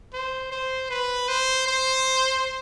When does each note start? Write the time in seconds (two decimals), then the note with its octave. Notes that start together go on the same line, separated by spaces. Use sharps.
0.13 C5
0.52 C5
0.90 B4
1.28 C5
1.67 C5